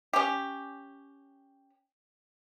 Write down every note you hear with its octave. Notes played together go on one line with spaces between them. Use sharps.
C#4 G4